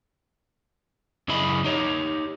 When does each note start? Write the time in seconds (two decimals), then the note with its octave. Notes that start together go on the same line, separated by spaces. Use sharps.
1.28 F#2 C#3 E4 G#4 D#5 B5
1.65 D#4 G4 C#5